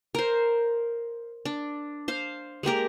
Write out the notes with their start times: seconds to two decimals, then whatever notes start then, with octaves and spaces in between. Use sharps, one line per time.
0.15 A#4 C5
1.45 D4
2.08 C5 F5
2.63 G#3 A#3 G4 A#4